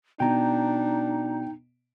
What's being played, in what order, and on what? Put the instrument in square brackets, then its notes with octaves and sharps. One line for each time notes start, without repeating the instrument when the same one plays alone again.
[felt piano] B2 [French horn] D4 [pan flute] D#4 [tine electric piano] G5 A#5